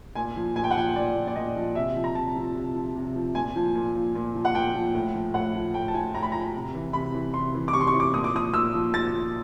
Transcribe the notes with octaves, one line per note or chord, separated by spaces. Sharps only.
A#2 G#5
F3
A#2 G#5
G5
F#5
F3 G5
A#2 D5
F3
D5
A#2 D#5
F3
C3 E5
F3
A#5
C3 A5
F3
C3
F3
C3
F3
A#2 G#5
F3
A#2
F3
A#2
F3
F#5
A#2 G5
F3
A2
F3
A2 F#5
F3
A2 G5
A5
F3 G#5
A2 A#5
B5
F3 A#5
C3
E3
C3 B5
E3
C3 C6
E3
D6
C3 C#6
C6
C#6
E3
D6
A#2 D#6
D6
F3 D#6
A#2 E6
F3
A#2 A6
F3